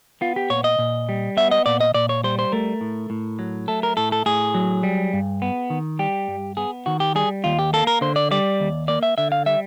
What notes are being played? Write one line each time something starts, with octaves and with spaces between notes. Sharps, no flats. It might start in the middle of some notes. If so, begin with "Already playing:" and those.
B3 F4
G4
A#2 C#5
D#5
A#2
G3
B3 E5
D#5
A#2 D5
D#5
A#2 D5
C#5
G3 C5
C5
A3 A#4
A2
A2
F#3
A3 A4
A#4
A2 A4
A4
A2 G#4
F#3
G3
G2
B3
D#3
G3 G4
G2
B3 G#4
D#3 F#4
G4
G3 G#4
D#2 F4
G4
A#3 A4
A#4
D3 C5
D5
G3 D5
D#2
A#3 D5
E5
D3 E5
F5
G3 E5